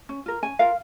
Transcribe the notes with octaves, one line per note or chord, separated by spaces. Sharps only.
C#4
F4 A#4
C#4 G#5
F4 A#4 F5